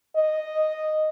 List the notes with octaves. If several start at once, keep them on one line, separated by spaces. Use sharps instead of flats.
D#5